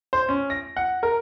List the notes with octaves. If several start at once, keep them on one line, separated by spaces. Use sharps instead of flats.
C5
C#4
A#6
F#5
A#4